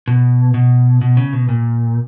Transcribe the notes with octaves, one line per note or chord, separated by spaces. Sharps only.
B2
B2
B2
C#3
B2
A#2